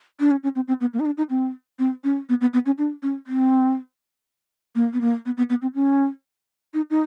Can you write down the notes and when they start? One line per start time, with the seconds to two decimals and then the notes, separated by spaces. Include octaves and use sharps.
0.20 D4
0.31 C#4
0.43 C#4
0.55 C4
0.68 C4
0.81 B3
0.93 A#3
1.00 D#4
1.06 D4
1.17 D#4
1.30 C4
1.79 C4
2.04 C#4
2.29 B3
2.41 B3
2.53 B3
2.66 C#4
2.78 D4
3.03 C#4
3.27 C4
4.75 A#3
4.93 B3
5.01 A#3
5.26 B3
5.37 B3
5.50 B3
5.62 C4
5.75 C#4
6.74 D#4
6.90 D#4